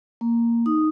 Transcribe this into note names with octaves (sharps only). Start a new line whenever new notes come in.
A#3
D#4 D#6